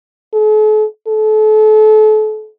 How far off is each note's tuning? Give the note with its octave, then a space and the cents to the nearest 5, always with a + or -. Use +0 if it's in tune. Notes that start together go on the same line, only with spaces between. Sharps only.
A4 -45
A4 -35